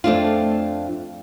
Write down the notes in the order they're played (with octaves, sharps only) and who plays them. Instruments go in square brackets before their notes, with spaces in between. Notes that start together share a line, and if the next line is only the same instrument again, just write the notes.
[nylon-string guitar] F2 A3 D4 F4